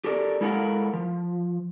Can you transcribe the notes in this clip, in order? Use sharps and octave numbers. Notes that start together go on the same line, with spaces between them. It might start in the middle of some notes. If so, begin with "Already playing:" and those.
G4 A4 A#4 D5
G#3 E4 A4 A#4 F5 F#5
F3